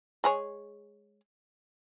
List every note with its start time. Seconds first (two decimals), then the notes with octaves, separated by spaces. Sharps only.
0.24 G#3 G#4 C#5